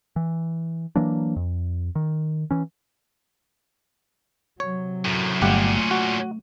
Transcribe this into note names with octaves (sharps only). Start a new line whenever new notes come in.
E3
E3 F#3 A#3 D4
F2
D#3
E3 C#4
C3 F#3 C#5
F#2 A2
G1 A#2 A3 C#4 G4 F#5
F#4